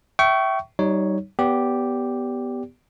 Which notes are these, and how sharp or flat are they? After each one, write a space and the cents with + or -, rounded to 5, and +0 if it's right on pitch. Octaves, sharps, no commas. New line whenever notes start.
E5 +5 G5 -30 C#6 +10
G3 -25 D#4 +0 C#5 +0
B3 +0 G4 +0 D5 -35